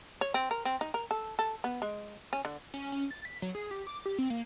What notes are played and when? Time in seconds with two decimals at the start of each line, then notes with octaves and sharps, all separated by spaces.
0.21 C#5
0.34 C4
0.51 A#4
0.65 C4
0.81 D#4
0.94 A#4
1.11 A4
1.39 A4
1.64 B3
1.82 G#3
2.33 C#4
2.45 D3
2.74 C#4
2.92 C#4
3.11 A6
3.25 B6
3.42 F#3
3.55 G#4
3.71 G4
3.87 D6
4.06 G4
4.18 C4
4.30 A#3